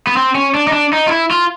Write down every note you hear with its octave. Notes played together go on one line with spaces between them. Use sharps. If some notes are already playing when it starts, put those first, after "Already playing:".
B3
C4
C#4
D4
D#4
D4
D#4
F4
E4
F4